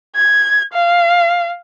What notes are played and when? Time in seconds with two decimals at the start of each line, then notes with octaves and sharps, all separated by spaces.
0.16 G#6
0.73 F5